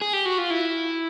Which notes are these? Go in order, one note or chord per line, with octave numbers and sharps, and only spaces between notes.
G#4
G4
F#4
F4
E4